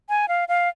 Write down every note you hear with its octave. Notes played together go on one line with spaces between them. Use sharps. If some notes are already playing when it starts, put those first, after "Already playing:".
G#5
F5
F5